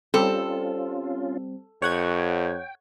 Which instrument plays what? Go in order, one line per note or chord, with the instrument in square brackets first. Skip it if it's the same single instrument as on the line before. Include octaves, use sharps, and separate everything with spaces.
[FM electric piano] G3 C4 [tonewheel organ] C#4 F4 [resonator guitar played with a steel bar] A4
[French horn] F2 [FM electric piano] C#5 F#5 G#6 [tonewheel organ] G5